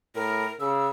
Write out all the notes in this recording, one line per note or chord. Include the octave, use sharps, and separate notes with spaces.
A2 A#4
C#3 E6